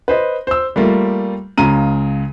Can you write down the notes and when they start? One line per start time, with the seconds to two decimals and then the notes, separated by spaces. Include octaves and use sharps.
0.08 B4 C5 D#5
0.47 C5 E6
0.76 G3 A3 A#3 F4
1.58 C#2 C#3 A#5 D#7